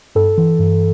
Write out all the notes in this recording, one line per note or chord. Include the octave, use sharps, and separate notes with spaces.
G2 A4
E3
G2